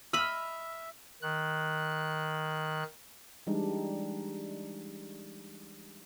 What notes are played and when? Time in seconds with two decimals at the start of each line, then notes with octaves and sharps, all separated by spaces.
0.13 D#5 E5 B5 E6 F6
1.22 D#3 F#6
3.47 E3 G3 G#3 D4 D#4